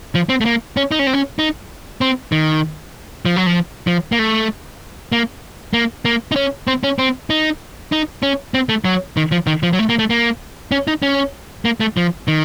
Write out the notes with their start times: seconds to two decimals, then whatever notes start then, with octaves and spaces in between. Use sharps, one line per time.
0.15 F3
0.29 C4
0.41 A3
0.45 A#3
0.77 C#4
0.91 D#4
0.99 C#4
1.07 C4
1.13 C#4
1.39 D#4
2.01 C4
2.32 D#3
3.25 F3
3.36 F#3
3.46 F3
3.87 F3
4.12 A#3
4.19 A3
5.12 A#3
5.73 A#3
6.05 A#3
6.32 D#4
6.36 C#4
6.67 C4
6.84 C#4
6.98 C4
7.30 D#4
7.92 D#4
8.23 C#4
8.54 C4
8.69 A3
8.85 F#3
9.17 D#3
9.32 F3
9.47 D#3
9.63 F3
9.73 F#3
9.79 A3
9.89 A#3
9.99 A3
10.10 A#3
10.72 C#4
10.87 D#4
11.03 C#4
11.65 A#3
11.80 A3
11.97 F3
12.28 D#3